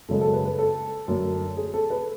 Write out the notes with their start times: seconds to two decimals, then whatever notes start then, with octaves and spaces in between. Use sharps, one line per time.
0.08 F#2 C#3 G#3 A4
0.21 A4
0.33 B4
0.45 B4
0.59 A4
1.08 F#2 D3 A3
1.57 G#4
1.74 A4
1.90 B4